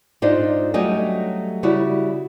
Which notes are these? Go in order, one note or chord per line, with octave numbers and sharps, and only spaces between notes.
G#2 D4 D#4 F4 C5
F#3 G3 A3 C#4 G4 D#5
C#3 G3 E4 F#4